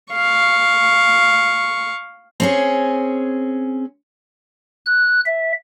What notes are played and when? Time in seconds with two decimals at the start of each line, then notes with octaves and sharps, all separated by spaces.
0.13 F5 C#6
2.40 C4 C#4 G#4
4.86 F#6
5.26 E5